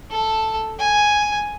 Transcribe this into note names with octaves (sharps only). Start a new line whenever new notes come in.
A4 A5
G#5